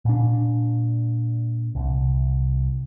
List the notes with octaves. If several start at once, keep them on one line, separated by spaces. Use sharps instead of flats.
A#2 D4
C2